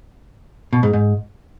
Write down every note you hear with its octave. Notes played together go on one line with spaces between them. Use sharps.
B2
G#2
G#2